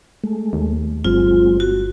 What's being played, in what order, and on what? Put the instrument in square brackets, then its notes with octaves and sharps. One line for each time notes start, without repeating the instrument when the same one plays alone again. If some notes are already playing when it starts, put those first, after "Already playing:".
[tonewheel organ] G#3 A3
[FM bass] D#2
[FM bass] G1 [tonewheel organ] F#3 G#3 C4 [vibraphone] F4
[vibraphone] F#4